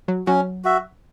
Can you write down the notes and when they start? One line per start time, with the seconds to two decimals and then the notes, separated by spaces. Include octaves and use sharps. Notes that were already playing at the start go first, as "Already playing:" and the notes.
0.08 F#3
0.27 F#3 C#4
0.65 F#4 E5